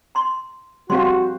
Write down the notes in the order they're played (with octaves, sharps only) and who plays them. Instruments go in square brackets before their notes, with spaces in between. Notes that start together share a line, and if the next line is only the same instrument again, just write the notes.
[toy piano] A#5 C6
[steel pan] G3 C4 C5 [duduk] F#4 [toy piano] F5 C6